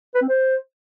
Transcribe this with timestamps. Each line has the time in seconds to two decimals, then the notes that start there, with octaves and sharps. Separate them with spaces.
0.15 B4
0.22 C4
0.29 C5